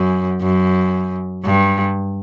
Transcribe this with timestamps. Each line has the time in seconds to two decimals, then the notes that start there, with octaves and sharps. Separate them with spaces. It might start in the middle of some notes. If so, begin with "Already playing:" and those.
Already playing: F#2
0.42 F#2
1.45 G2